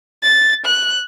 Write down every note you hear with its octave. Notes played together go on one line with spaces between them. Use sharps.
A6
F#6